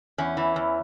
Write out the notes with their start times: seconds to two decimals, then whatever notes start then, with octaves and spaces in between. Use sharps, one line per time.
0.18 E2 C#4
0.37 E3
0.56 E2